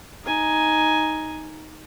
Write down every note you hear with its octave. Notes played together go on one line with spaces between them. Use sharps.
D#4 G#5